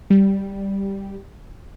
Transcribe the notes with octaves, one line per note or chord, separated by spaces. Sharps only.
G3